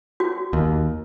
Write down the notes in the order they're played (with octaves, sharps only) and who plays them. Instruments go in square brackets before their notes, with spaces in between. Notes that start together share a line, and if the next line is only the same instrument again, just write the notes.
[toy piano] F#4
[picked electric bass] D#2